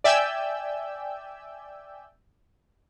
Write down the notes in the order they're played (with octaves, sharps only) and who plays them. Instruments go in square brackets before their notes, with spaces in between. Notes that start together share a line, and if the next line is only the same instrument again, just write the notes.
[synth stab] D5 E5 G5 G#5 E6 G6